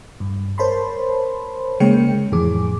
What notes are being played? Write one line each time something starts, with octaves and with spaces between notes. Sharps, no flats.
G2
A#4 C5 C#5 A5 B5 C6
C#3 G#3 A#3 C#5 G5 C#7
F2 A2 E3 G#4 D6